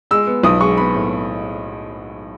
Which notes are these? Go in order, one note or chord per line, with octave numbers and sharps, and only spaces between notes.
G#3 E6
B3
B1 D#6
G#3 C#6
B3 B5
A2